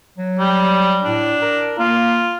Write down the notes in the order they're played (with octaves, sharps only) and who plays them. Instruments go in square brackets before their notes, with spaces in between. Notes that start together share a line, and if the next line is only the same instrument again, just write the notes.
[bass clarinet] F#3
[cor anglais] G3
[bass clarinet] A2 [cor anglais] D4
[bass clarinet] A#4
[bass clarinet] A#3 [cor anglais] F4